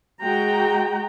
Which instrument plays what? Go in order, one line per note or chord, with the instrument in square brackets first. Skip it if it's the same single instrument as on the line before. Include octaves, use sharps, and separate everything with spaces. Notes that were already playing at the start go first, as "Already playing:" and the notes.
[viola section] G#3 F#4 G5 A#5